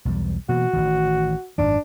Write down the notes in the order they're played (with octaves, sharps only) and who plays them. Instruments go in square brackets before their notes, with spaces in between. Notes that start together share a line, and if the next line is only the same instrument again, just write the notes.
[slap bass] B1 E2 G3
[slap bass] B2 E3 A#3 [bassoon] F#4
[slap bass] A1 D#3
[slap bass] G#1 F#2 D#3 [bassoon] D4